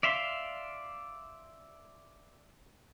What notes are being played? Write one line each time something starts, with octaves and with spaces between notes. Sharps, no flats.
D5 E5 F5 C6